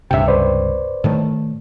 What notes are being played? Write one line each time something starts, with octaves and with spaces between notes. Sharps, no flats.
C#2 G2 C3 E5 G5
B4 C5 D5
A2 D#3 A3